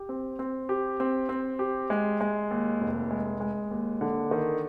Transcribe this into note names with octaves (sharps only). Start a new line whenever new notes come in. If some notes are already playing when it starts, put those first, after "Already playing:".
Already playing: G4
C4
C4
G4
C4
C4
G4
G#3
G#3
D#2
F1
G#3
G#3
D#2
D3
D#3